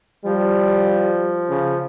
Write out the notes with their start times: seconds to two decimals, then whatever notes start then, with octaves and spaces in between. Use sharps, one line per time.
0.25 F3 G3
1.49 C#3